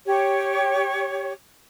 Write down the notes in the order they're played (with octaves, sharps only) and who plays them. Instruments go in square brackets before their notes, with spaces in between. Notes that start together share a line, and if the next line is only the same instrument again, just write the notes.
[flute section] G4 C#5